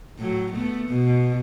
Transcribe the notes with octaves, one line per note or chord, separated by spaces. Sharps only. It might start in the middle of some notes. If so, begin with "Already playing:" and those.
A2 F#3
A3 B3
B2